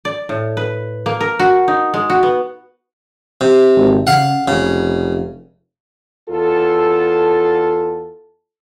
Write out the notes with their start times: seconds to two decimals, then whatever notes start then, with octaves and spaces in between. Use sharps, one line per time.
0.05 D5
0.29 A2
0.57 B4
1.06 A#3
1.20 A#4
1.39 F#4
1.68 D#4
1.94 G#3
2.10 F#4
2.23 B3
3.41 C3
3.76 G#1
4.07 C#3 F5 F#5
4.48 F1 C#3
6.29 E2 F4 A4